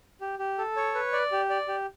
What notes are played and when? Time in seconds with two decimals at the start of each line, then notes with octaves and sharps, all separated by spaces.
0.21 G4
0.39 G4
0.58 A4
0.76 C#5
0.95 B4
1.13 D5
1.32 G4
1.50 D5
1.68 G4